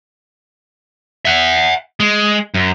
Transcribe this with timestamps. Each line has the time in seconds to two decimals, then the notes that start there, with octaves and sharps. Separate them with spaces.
1.25 E5 F#5
2.00 G#3
2.54 F#2